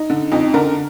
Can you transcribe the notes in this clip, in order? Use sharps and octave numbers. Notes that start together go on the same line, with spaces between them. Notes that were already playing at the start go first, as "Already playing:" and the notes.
Already playing: D#4
D3
F2 D#4
D3 A#4